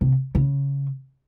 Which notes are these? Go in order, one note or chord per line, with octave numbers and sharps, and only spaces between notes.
C3
C#3